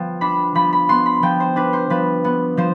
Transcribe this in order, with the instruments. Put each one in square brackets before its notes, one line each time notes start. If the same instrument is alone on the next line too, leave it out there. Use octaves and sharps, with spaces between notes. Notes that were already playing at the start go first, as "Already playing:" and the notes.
Already playing: [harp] F3 B3 G5
D4 B5
F3 B5
B5
B3 C6
B5
F3 G5
C5
D4 B4
C5
F3 B4
B3
F3 C5